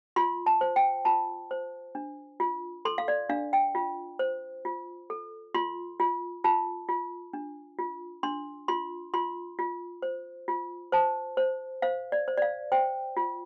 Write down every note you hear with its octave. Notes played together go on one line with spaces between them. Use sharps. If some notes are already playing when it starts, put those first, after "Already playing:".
F4 C6
A5
C5
G5
F4 A5
C5
D4
F4
A4 C6
F5
D5
D4 F5
G5
F4
C5
F4
A4
F4 C6
F4
F4 A5
F4
D4
F4
D4 C6
F4 C6
F4 C6
F4
C5
F4
C5 A5
C5
C5 F5
D5
C5
D5
F5
C5 G5
F4